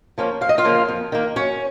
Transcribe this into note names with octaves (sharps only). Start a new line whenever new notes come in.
F3 A#3 C#4
F2 F5
D#5
F4 F5
C#3 F3 A#3
F2
D#3 A#3
F#2 C#4 C#5